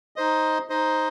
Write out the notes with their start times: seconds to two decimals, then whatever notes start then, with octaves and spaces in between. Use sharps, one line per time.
0.16 D#4 C5 D#5
0.69 D#4 C5 D#5